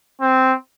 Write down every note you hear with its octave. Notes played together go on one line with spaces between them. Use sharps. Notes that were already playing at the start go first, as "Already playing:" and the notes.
C4